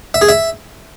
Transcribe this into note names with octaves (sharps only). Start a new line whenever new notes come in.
E5
G#4
E5